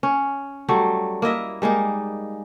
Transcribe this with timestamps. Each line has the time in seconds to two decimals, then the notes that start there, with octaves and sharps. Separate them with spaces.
0.03 C#4
0.68 F#3 G3 A3
1.22 A#3 E4 D#5 E5
1.62 G3 G#3 A#3 D#4